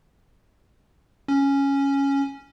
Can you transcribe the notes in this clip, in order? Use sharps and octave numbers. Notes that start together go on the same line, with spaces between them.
C#4